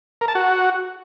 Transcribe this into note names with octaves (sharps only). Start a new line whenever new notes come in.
A#4
A5
F#4